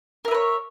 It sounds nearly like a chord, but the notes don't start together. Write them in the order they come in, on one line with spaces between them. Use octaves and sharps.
A#4 E5 B4 C#5